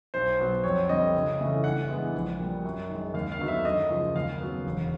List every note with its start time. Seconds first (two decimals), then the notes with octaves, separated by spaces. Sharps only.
0.14 B1 C5
0.39 B2 F#3 B3
0.64 F2 C#5
0.88 D3 G3 C4 D#5
1.14 C#2
1.40 C#3 E3 A3 C#4
1.64 G2 F#5
1.89 E3 G#3 B3
2.14 A#1
2.39 A#2 G3
2.64 F#2
2.89 D#3 G#3
3.14 D#2 F5
3.32 F5
3.39 D3 F#3 B3 D#4
3.48 E5
3.65 F#2 D#5
3.89 C#3 F3 G#3
4.15 D#2 F5
4.40 C#3 F#3 B3
4.66 E1